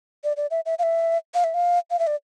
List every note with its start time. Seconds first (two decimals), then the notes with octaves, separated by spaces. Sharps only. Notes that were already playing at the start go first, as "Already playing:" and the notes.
0.24 D5
0.37 D5
0.51 E5
0.66 E5
0.79 F5
0.83 E5
1.34 F5
1.44 E5
1.54 F5
1.91 F5
1.99 E5
2.07 D5